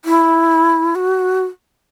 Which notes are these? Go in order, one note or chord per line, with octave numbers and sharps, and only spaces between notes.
E4
F#4